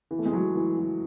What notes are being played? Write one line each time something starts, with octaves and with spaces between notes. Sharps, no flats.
E3
A3
G#3
F#3
E3
F#3